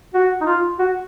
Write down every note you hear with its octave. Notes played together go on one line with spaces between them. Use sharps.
F#4
D#4
F4
F#4